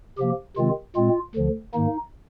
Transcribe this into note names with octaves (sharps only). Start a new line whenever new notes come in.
C3 F3 A#3 G4
C3 D#3 G#3 C4 F4
A#2 G#3 C4 F4
D2 D3 F3
G#2 D#3 A#3 D#4